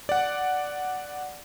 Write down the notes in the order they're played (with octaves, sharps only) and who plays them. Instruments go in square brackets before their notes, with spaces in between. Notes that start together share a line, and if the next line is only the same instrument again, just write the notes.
[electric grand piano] D5 F#5